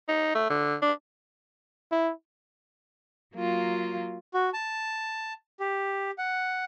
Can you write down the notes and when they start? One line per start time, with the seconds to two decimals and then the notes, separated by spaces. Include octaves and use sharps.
0.09 D#4
0.35 A3
0.50 D3
0.82 D4
1.91 E4
3.34 F#3 A#3 F4
4.34 F#4
4.54 A5
5.60 G4
6.18 F#5